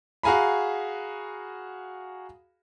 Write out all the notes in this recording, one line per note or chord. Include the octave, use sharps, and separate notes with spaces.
F#4 G#4 F5 G#5 A#5 B5